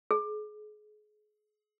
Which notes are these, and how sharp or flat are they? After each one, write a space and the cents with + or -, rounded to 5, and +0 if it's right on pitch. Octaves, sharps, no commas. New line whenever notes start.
G#4 +35